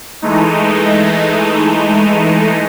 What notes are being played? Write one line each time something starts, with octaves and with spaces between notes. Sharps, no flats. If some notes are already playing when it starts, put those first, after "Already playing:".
E3 G#3 A3 D#4